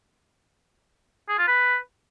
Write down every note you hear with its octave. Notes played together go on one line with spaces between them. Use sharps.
G#4
F4
B4